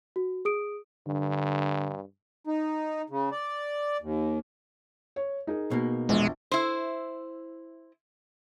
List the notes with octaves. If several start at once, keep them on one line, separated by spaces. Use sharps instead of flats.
F#4
G#4 D#6 D7
G2 D3
D#4
C#3
D5
D#2
C#5
D#4 G#4 A#4
B2 A#3
A#1 E2 G#3
E4 C5